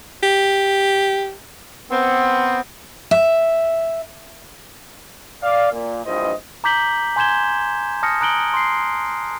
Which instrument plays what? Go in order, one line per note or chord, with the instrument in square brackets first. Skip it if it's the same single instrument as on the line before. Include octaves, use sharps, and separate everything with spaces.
[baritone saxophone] G4
[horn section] B3 C4
[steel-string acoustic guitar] E5
[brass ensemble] D5 F5
A#2
A#1 G2 E3 F4 C5 D#5
[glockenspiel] A#5 D6 G6 B6 F#7 G7
G#5 C6 G6 G#6 E7 G7
A5 D#6 F6 A#6 C#7
A#5 D#6 F#6 D7 F#7 G7
C6 C7